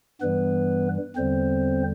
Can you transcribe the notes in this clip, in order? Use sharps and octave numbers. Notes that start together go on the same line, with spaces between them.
G2 E3 G3 B3 B4
E2 D3 G3 C4 C5